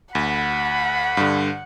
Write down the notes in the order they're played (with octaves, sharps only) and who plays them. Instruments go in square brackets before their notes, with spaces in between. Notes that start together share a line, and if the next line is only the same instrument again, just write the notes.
[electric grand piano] D2 [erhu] F#5 [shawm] B5
[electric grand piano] G2 D3